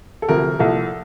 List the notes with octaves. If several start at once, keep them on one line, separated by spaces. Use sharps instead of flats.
A4
D2 C3 F3 A#4
C2 A#2 F3 A4